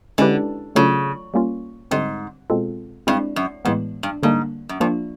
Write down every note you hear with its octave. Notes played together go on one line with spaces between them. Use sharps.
D3 G#3 C#4 E4 G4 B4
C#3 F#3 A3 D4 F4 A4
G3 A#3 C#4 F4
G#2 D3 G3 C4
B2 G#3 C4 F4 A4
G2 G#3 C4 E4
F#2
F2 A2 E3 G#3 B3
G2
G#2 D3 G3 A#3 D4
F#2
G2 F3 A#3 D4 F4